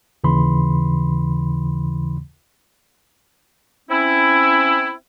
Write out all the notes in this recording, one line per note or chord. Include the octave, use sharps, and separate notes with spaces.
D#2 C#3 E3 B5 C6
C4 C#4 E4